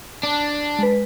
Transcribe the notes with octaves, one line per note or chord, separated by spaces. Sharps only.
D4
G#3 B4